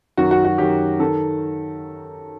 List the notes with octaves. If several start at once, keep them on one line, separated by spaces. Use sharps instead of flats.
F#2 D#3 F#4
F#4
F#4
F#2 D#3 G4
D#3 A4